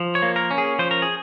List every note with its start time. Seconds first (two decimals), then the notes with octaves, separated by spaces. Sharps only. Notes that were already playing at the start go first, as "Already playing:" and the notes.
Already playing: F3
0.15 C#5
0.22 A#3
0.36 A#4
0.51 C#4
0.58 G#4
0.79 F3 C5
0.91 A#4
1.02 G#4